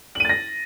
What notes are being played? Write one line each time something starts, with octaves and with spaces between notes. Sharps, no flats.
A6 A#6 D#7 F#7